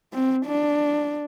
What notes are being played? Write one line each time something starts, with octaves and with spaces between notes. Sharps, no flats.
C4
D4